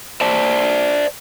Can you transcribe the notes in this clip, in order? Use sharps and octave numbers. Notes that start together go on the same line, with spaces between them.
C5 D5 A5